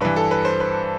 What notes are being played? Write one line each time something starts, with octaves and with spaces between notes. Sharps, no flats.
G2 E3 B4
A4
B4
C5
B4